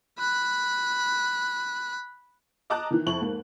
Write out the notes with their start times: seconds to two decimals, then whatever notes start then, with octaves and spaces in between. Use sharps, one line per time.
0.18 B5 F#6
2.70 D#5 A5 A#5 D6 D#6 F#6
2.91 D#3 E3
3.06 F2 E4 C#6 F#7
3.22 G#2 A#3